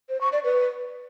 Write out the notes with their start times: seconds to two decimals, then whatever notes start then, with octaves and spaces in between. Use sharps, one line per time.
0.09 C5
0.21 C#6
0.32 D5
0.44 B4